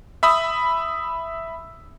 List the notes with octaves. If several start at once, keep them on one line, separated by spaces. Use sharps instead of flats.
E5 B5 D#6 E6